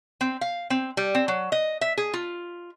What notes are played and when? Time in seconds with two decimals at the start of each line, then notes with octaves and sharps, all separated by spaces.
0.21 C4
0.41 F5
0.70 C4
0.97 G3
1.15 C4
1.28 F#3
1.52 D#5
1.81 E5
1.98 G#4
2.14 F4